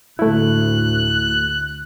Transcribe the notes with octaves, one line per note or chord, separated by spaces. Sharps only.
D2 A2 A3 E4 F#6